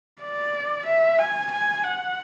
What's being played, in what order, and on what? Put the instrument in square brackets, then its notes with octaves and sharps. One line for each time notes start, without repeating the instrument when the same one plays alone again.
[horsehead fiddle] D5
E5
G#5
G#5
F#5